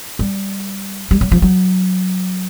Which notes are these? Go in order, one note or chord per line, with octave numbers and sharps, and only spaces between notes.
G3
G3
F#3
F3
F#3